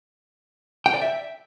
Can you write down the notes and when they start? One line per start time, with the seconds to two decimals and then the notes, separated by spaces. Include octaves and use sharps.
0.86 G5
0.94 D5
1.02 E5